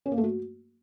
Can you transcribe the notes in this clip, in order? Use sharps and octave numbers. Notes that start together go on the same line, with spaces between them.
C#4
A#3
A3
F#4